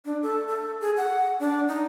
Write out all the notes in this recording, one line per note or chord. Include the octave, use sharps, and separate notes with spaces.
D4
A4
A4
G#4
F#5
D4
D#4